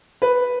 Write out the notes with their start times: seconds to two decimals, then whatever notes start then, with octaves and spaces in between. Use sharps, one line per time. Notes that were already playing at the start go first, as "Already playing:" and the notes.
0.22 B4